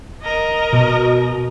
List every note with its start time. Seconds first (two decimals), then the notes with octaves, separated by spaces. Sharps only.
0.23 A#4 D#5
0.73 B2